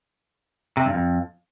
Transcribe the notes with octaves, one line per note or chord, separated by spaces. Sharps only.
C3
G2
F2